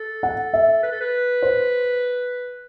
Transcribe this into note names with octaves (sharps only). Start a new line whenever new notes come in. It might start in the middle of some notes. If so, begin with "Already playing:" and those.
Already playing: A4
F#5
E5
B4
A4
B4
C5